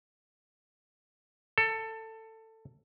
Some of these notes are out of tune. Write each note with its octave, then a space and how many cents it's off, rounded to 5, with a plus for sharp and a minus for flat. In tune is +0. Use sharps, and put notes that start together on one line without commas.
A4 +15